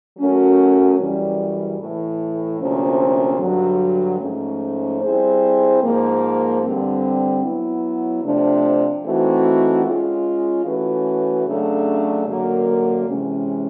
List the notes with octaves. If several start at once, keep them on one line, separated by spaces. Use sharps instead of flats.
F#3 A3 C#4 F#4 A#4
F#2 C#3 E3 G3
A2 E3 A3
D2 C3 F3 A#3 C#4
G2 D3 F#3
G#2 F3 A3 C#4
G3 C4 E4 G#4 C5
G#2 F3 A#3
G2 D3 G3 C4
F#3 B3 E4
C3 F3 A3 D4
E3 A3 C4 D#4 F#4
G#3 C#4 F4
E3 A3 C#4 F#4 B4
C#3 F#3 A3 D4
F#2 D3 F#3 A#3
C3 E3 G#3 C#4